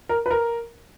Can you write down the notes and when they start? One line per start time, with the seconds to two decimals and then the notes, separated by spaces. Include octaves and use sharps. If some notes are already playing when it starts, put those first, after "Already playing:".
0.09 A#4
0.26 B4
0.31 A#4